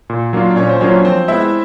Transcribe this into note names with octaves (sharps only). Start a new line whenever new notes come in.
A#2
F#3 A#3 D4 F4
D5
A#2 C#4 C#5
C5
F#3 A#3 C#4 D4 F4 C#5
F3 C4 C5
G#3 B3 E4 E5